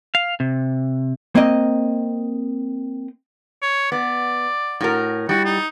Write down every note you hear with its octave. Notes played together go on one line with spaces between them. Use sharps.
F5
C3
A#3 C4 D#5
C#5
B3 D5
A2 F#4 A#4
G3 E4 F#4
D#4